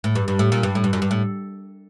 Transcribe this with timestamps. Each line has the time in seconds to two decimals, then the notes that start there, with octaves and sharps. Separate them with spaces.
0.04 A2
0.15 G2
0.28 G2
0.39 A2
0.52 A#2
0.63 G2
0.75 A2
0.84 G2
0.93 F#2
1.02 G2
1.11 A2